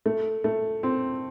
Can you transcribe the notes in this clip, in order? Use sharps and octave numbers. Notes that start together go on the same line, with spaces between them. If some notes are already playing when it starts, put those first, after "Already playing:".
A3
A3
C4